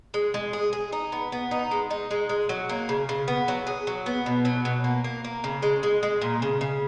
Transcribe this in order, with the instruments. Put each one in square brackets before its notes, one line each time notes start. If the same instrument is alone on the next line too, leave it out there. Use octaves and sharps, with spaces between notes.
[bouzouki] G#3
G#3
G#4
G#4
D#4
B3
B3
D#4
G#3
D#4
G#3
G#3
F#3
A#3
C#3
C#3
B3
F#3
G#4
F#3
B3
B2
F#3
B2
A#3
A#3
A#3
C#3
G#3
G#3
G#3
A#2
C#3
C#3